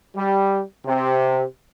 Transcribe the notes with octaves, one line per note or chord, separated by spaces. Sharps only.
G3
C3